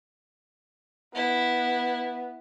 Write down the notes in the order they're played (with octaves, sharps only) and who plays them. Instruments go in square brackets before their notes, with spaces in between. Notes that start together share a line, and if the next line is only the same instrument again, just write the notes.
[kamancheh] B3 [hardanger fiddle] E4